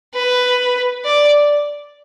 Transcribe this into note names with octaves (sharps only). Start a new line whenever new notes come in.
B4
D5